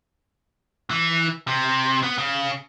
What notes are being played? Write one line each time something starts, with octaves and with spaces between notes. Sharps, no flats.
E3
C3
B3
C#3